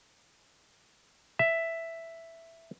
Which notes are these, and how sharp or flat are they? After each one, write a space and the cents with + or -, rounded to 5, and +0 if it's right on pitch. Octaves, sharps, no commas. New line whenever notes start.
E5 +5